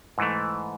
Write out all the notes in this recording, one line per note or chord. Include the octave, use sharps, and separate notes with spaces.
G#2 E3 A3